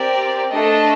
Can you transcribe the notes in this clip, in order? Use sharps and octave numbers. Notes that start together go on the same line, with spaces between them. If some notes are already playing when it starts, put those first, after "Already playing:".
Already playing: C4 G4 A#4 D5
A3 D4 A4 D#5 A5